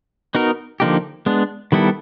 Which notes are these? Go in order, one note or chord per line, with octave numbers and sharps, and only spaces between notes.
B3 D#4 F#4 A#4
D3 F3 A#3 D#4 G4
G#3 B3 D4
D#3 G3 B3 E4 A4